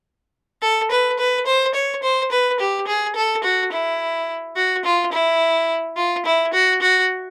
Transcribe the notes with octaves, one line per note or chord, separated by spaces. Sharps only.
A4
B4
B4
C5
C#5
C5
B4
G4
G#4
A4
F#4
E4
F#4
F4
E4
F4
E4
F#4
F#4